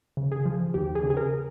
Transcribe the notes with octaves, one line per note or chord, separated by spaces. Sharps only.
C#3
G#4
F3
D#2 G4
G#4
C#3
G#4
A#4